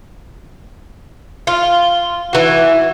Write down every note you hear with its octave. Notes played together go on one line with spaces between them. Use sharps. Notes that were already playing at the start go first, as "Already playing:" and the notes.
F4
E3 F#4